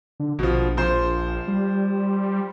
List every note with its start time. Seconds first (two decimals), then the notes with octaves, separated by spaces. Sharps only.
0.20 D3
0.39 A#1 B2 F3
0.77 F3 C5 C6
1.48 G3